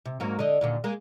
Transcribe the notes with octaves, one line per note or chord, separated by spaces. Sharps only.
C3
G#2 F#3 A#3
D3 D#5
D#2 A#2 D3
G#3 A#3